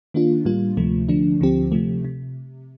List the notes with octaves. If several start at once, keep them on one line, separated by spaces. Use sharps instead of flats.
D#3 A#3 D4 F4
A2 G3 A#3 F4
D2 C3 F3 A3
D3 F3 A3 D4
D2 D3 F3 C4 G4
C3 F3 A3
C3